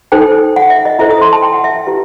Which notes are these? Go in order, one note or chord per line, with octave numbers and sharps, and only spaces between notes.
D#4 A4 C5 G5
F#5
E5
D#5
E4 A4 C5 E5
D#6
C6
A5
G5
F#5
E5
E5
E4 G4 B4